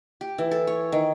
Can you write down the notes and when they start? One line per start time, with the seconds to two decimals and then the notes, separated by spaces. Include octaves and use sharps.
0.21 G4
0.38 E3
0.51 A4
0.67 C#5
0.92 D#3